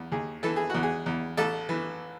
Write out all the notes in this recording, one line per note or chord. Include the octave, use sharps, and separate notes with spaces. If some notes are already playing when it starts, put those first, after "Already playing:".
Already playing: E2
D#2 G#4
E3 A4
G#4
E2 F#4
G#4
E2
A1 A4
E3